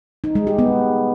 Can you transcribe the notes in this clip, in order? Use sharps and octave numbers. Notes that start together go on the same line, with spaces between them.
D#4
G#3
G4
B3